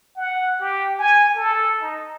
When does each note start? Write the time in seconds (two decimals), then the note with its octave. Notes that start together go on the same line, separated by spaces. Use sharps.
0.16 F#5
0.60 G4
0.99 G#5
1.36 A4
1.82 D#4